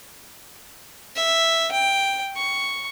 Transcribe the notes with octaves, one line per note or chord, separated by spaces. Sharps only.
E5
G5
C#6